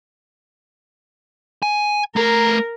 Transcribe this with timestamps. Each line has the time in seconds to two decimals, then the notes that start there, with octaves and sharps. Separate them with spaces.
1.63 G#5
2.16 A3 A#4 A#5